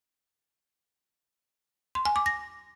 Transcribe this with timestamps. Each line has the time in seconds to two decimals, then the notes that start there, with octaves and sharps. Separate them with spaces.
1.95 C6
2.05 G#5
2.16 D6
2.26 A#6